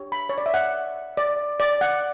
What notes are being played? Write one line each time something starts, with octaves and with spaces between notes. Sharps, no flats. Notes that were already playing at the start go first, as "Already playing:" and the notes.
Already playing: D4 G4 C#5
B5
C#5
D5
E5
F#5
D5
D5
F#5